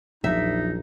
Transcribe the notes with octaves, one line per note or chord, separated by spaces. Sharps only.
A#1 E2 F3 F#3 D#4 E5